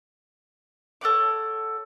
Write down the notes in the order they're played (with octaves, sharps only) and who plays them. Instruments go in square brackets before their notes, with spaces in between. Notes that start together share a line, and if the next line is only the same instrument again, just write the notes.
[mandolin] A4 C#5 F#5 D6